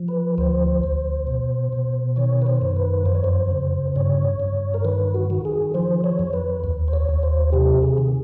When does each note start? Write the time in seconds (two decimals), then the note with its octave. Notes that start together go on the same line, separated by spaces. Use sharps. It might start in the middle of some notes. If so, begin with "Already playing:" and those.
Already playing: F3
0.08 B4
0.38 D2 C5
0.83 D2
1.27 B2
1.72 B2
2.16 D#3 C#5
2.42 B4
2.46 C5
2.62 F#2
2.76 B4
3.06 F2 C5
3.15 C#5
3.24 C5
3.51 C#3
3.96 G2 C#5
4.40 G2
4.74 A#4
4.85 D#3 B4
5.14 F#4
5.30 D#3
5.45 G#4
5.74 F3 C5
6.04 C#5
6.19 F2
6.33 B4
6.64 D#2
6.88 C5
6.93 C#5
7.09 D#2
7.23 C5
7.52 C3 G4
7.83 G#4
7.98 D#3